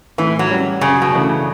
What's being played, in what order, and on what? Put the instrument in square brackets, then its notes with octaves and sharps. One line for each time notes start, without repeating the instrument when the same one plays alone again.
[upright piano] A2 [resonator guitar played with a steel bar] E3
[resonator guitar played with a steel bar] F#3
[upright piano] G3 C#4
[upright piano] F#2 [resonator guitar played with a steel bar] C#3
[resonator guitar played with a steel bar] B2
[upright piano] C#3 E3 A3 D4